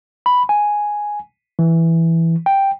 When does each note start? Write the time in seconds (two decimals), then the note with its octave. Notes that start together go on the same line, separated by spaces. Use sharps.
0.26 B5
0.49 G#5
1.59 E3
2.46 G5